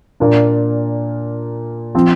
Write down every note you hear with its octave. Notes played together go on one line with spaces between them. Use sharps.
A#2 A#3 D4
F3 C4